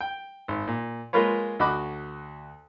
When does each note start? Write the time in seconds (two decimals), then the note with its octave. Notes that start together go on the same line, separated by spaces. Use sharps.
0.01 G5
0.48 G#1
0.67 A#2
1.13 G#3 A#3 F4 A#4 B4 C#5
1.59 D2 F#4 D#5 B5 D6 F#6